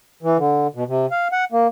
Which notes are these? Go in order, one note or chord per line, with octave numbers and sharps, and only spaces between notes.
E3
D3
B2
C3
F5
F#5
A#3